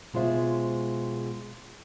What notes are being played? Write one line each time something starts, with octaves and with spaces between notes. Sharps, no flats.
B2 G#3 F4 C5 E5